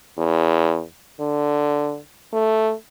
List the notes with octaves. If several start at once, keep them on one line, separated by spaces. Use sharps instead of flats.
E2
D3
A3